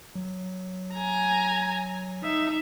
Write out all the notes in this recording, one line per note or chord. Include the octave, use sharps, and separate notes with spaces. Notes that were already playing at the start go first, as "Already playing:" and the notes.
F#3
G#5 A#5
D#4 E5